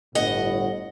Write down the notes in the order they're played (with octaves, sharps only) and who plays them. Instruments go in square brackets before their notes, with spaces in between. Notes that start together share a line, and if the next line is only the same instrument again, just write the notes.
[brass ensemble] G1 A2 [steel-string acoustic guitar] D#5 F#5